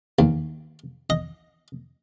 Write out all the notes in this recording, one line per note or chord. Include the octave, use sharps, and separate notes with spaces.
D#2
D#5